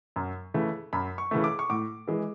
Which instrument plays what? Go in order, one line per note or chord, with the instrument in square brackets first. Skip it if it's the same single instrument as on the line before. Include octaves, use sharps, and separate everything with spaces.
[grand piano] F#2
C#3 E3 A3
F#2 B5
C#6
C#3 E3 A3
D6
C#6
A2 D6
E3 G#3